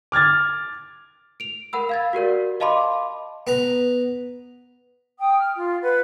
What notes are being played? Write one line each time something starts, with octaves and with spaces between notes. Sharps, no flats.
D6 F6 G#6 A6
D7 F7
A#4 F#5 B5 E6
F5 G#6 A6
F#4 G4 A#4 D5
D#5 F5 A5 B5 C6 D6
B3 B4 A#5
G5 D#6
F6
F4
B4 F#5